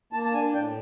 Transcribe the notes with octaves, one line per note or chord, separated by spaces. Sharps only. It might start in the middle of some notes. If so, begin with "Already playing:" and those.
A#3 A5
A5
D4 G#5
A2 G5